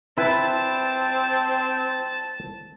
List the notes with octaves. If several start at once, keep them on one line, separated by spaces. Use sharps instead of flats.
C4 E4 B4 A5